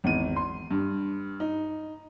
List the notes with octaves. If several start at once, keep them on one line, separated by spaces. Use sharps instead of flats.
G#1 E2 D#7
C6
G2
D#4